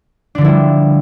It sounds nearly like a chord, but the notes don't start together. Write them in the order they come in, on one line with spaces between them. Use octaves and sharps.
D4 D3 F3 E4 G3